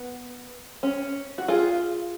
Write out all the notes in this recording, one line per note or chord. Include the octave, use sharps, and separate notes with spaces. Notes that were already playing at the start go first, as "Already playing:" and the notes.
Already playing: B3
C#4
F#4
F4 G#4